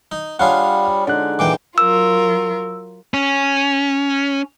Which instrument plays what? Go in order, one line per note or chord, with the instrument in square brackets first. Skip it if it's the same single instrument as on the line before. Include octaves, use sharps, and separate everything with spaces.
[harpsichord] D#4
[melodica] G3 [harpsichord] D4 F4 G#4 [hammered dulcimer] C#5 [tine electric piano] F5 F#5
[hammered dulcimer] D3 G#3 D#4 [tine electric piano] D5 F#6
[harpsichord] A#2 E3 G5 [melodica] D6
[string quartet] F#3 F4 A#4 [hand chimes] E6
[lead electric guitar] C#4